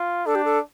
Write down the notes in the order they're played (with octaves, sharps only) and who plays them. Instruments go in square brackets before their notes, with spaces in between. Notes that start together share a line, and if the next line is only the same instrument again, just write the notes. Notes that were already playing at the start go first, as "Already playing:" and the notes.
Already playing: [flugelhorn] F4
[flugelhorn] D4 [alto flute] A4
[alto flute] G4
A4